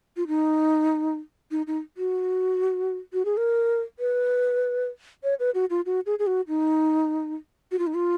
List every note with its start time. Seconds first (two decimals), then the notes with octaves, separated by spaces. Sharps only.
0.17 F4
0.27 D#4
1.51 D#4
1.67 D#4
1.97 F#4
3.13 F#4
3.25 G#4
3.37 A#4
3.99 B4
5.24 C#5
5.40 B4
5.55 F#4
5.70 F4
5.86 F#4
6.06 G#4
6.19 G#4
6.27 F#4
6.48 D#4
7.72 F#4
7.79 F4
7.87 D#4
7.94 F4